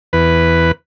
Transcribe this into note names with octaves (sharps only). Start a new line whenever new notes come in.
E2 B4